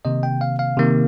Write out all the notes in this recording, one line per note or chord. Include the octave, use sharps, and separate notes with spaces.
C3 D#3 A#3 D#5
G5
F5
F5
C3 D#3 A#3